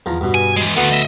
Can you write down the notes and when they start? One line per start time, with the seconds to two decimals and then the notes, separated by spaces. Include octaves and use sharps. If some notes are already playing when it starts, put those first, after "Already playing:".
0.06 E2 F3 A#5
0.21 G2 B2
0.35 G#5
0.57 E3 G#3
0.77 D2 A3 B3 B4 C6
0.92 D#5 E5